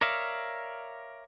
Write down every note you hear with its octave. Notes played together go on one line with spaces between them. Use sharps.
A#4 C#5 D5 E5 F5